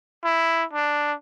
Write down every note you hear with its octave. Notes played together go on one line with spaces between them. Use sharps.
E4
D4